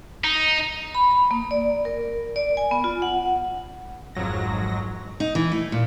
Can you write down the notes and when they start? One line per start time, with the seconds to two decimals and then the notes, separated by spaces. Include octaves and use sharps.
0.24 D#4
0.95 B5
1.31 A#3
1.51 D5
1.85 A#4
2.36 D5
2.57 G#5
2.71 B3
2.84 F4
3.02 F#5
4.15 G#1 F2 G#2 F#3 A#6
5.20 D#4
5.35 E3
5.52 A3
5.72 A#2